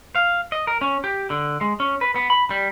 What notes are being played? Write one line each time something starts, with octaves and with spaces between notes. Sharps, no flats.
F5
D#5
A#4
C#4
G4
D3
G#3
C#4
B4
B3
B5
G3